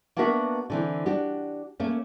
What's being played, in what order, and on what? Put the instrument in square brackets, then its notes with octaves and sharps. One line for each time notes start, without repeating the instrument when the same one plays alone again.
[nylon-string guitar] A#3 B3 D4 F#4 A#4 E5
D3 E3 C4
D4 F#4 G4
A3 A#3 C#4